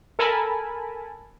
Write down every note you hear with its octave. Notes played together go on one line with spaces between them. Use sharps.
A4 A#4 G#5 A5 B5